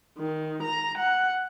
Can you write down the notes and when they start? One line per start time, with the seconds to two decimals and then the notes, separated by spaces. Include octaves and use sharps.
0.19 D#3
0.65 A#5
0.98 F#5